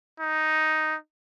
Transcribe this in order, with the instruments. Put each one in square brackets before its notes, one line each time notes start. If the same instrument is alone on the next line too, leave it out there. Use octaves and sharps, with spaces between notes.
[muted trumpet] D#4